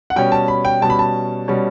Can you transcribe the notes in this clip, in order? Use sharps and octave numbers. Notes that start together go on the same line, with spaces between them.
F#5
B2 G3 C#4 G5
A5
B5
G5
B2 G3 C#4 A5
B5
A5
B2 G3 C#4